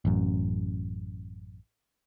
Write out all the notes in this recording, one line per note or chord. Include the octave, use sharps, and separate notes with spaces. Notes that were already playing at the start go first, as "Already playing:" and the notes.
A1 F#2